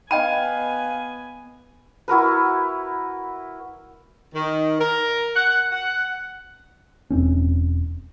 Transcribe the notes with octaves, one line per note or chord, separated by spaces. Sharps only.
B3 D#5 F5 G5 G#5 B5 D#7
E4 F#4 A#4 B4
D#3
A#4
F#5
F#5
E1 C4 C#4